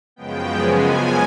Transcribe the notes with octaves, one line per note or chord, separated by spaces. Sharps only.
F#2 C#3 F3 G#3 B3 G5
G#5